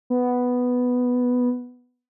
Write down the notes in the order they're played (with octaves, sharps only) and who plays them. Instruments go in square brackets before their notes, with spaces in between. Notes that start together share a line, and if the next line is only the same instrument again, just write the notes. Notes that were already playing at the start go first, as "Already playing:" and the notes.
[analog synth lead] B3